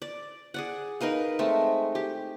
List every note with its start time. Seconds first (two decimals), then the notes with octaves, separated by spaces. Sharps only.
0.02 D5
0.54 G#4 D5 F#5
1.01 D#4 A#4 B4 F5
1.39 G#3 A3 C4
1.95 G4